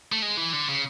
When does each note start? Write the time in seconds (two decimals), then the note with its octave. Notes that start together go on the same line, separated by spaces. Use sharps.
0.12 A3
0.22 G#3
0.37 E3
0.53 D3
0.69 C#3